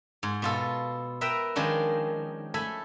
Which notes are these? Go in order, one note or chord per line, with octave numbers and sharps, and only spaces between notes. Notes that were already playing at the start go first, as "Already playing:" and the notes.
G#2
B2 F4 A4
A#4 B4 E5 G5 A#5
D#3 F3 G#3 C#4 D4
A3 A4 G#5 B5